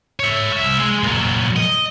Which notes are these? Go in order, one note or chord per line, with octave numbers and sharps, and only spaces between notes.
C#5 E5
C2 E5
G#3
A#2 F#3
D#5